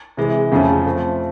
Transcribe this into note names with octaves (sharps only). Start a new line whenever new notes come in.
C3 E3 G#3
F2 C#3 F3 A3 C#4
F3 A3 C4